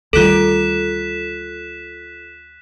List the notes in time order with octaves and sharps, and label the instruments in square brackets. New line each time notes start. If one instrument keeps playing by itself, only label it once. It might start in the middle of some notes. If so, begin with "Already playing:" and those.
[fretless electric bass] D2 D#3 G3 [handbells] F4 A4 [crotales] F#6 B6 E7